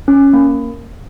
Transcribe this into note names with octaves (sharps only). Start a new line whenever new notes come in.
C#4
A#3